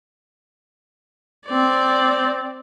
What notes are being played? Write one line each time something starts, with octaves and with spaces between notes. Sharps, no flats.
C4 D5